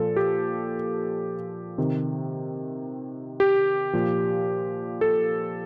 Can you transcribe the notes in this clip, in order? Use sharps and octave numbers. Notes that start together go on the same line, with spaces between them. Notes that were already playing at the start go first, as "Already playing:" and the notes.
Already playing: A#2 F3 A4
G4
C3 D#3
G4
A#2 F3
A4